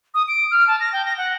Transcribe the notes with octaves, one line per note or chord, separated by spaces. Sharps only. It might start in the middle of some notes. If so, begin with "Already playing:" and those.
D#6
D7
F6
A5
A#6
G5
A#6
F#5